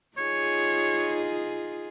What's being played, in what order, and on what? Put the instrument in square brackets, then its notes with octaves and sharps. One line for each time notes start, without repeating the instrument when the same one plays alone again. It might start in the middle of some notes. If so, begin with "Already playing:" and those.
[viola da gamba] D#4 F4 G#4 [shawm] C#5